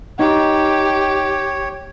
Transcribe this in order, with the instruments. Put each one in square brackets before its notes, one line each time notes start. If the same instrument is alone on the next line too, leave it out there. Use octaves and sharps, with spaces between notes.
[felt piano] D#4 [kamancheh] G4 [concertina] C#5